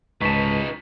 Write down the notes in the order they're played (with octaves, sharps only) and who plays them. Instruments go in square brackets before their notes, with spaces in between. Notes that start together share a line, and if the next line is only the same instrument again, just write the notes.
[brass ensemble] C#2 [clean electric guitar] G#2 A5 [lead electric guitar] D#4 B4 [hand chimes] C#6 B6